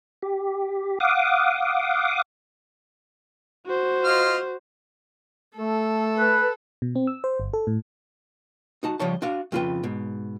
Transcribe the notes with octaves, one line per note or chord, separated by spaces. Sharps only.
G4
F5 F#5 D6 D#6
F#4 C5
F4 D#5 F6
A3 A4
B4
B2
C4
E6
C5
G1
A4
A2
D#4 F#4 A5
C#3 F3 G3 C#5 A5
D4 F#4 F5
F2 C#3 F4 F#4 B4 G5
G#2 B2